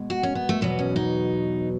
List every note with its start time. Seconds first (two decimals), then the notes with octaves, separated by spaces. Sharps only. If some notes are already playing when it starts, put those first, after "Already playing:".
Already playing: B2 G#3
0.10 F#4
0.23 C#4
0.35 B3
0.49 A3
0.61 E2 B2 F#3 B3
0.79 C#4
0.96 D#4